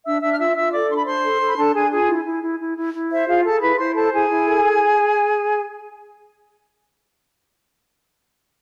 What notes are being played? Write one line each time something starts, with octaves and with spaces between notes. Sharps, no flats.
D4 E5 E6
D4 E5 E6
F6
F4 E5 E6
F4 E5 E6
A4 D5 D6
D4 C6
B5
D4 C5 C6
A4
A4
B5
D4 A4 A5
D4 G#4 G#5
F4 G#4 G#5
E4
E4
E4
E4
E4
E4
C5 E5
F4 G#4 F5
G#4 A4 A5
E4 B4 B5
E4 C5 C6
A4 C5 A5
E4 G#4 G#5
E4
A4